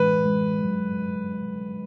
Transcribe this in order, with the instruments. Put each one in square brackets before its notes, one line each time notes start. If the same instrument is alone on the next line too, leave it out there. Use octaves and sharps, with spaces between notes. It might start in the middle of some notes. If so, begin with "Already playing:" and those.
Already playing: [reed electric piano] A2 E3 G#3 [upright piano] B4
[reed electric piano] G#3
F#3